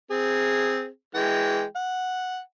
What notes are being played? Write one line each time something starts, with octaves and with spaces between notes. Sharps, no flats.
C4 G#4
E3 G#3 G5
F#5